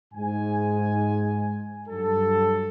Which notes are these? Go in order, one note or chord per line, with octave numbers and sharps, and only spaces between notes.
G#2 G#5
G2 F#3 A4